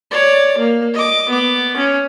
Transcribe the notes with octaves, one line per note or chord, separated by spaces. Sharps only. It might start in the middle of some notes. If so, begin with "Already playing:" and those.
C#5 D5
A#3
D#5 D6
B3 D6
C#4